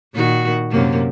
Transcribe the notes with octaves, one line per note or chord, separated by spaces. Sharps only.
A#2 D#3 F#4
F#2 C3 A#3